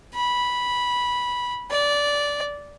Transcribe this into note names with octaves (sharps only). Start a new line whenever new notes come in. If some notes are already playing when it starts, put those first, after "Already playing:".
B5
D5